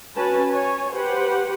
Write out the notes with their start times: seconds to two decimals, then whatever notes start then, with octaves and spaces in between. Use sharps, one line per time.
0.15 C#4 F#4 B4 G#5 A5
0.51 C#5 G#5
0.94 G4 B4 C5 F#5